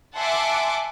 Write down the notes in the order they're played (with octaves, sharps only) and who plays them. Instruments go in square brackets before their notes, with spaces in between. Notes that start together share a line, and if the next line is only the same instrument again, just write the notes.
[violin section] E5 F#5 G#5 A5 C6 D6